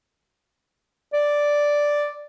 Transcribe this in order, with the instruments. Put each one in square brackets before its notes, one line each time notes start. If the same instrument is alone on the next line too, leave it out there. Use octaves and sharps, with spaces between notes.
[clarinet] D5